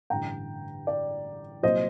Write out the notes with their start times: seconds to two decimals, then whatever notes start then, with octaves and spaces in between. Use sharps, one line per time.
0.10 A1 G2 D3 G5 A#5
0.87 D5
1.63 C2 A#2 F#3 C5 D#5